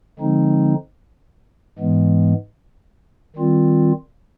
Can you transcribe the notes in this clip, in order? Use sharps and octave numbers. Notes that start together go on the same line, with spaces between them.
D3 F3 G#3 C4 D#4
G#2 E3 G#3 B3
D#3 G3 C4 F4